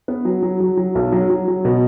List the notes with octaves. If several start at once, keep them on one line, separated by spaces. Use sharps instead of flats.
B3
F#3
F#3
F#3
F#3
B1
F#3
F#3
F#3
B2